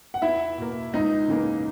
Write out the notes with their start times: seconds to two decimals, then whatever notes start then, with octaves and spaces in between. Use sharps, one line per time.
0.14 F#5
0.22 E2 E4 E5
0.58 B2 A#3
0.94 C#2 D#4 D#5
1.28 C#3 E3 A#3